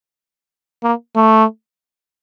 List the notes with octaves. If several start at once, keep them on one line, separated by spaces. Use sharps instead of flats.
A#3
A3